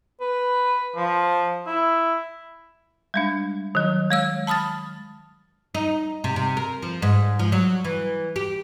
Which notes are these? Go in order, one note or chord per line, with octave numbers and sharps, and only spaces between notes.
B4
F3
E4
G3 G#3 D4
D#3 F#3
G#3 C#5 E6
A5 B5 D#6 F6 A6
D#4
C3
C3
A#4
F3
G#2
F3
F#3
E3
G4